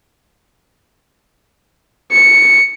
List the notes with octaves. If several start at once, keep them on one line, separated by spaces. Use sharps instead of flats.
C#7